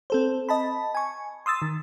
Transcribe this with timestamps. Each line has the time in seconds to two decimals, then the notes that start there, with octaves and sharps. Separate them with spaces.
0.10 C4 A4 C5
0.49 D#5 A5 B5
0.95 G#5 C#6
1.46 C6 D#6 E6 A6
1.62 D#3